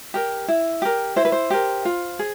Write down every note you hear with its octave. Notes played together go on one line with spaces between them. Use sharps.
G4 A#4
E4
G4 A#4
E4 C5
B4
C5
G4 A#4
F4
G#4